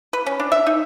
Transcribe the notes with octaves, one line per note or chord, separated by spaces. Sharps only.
B4
C#4
D4
E5
D#4